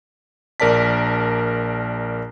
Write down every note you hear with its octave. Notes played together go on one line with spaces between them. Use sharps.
A#1 A#4 D5 A5 B6